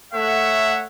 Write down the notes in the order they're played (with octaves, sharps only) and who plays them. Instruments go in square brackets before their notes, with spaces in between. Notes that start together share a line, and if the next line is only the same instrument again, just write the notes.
[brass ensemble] A3 C#5 F#5 [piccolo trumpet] E5